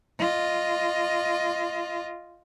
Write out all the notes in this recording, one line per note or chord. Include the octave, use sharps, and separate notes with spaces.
F4 D#5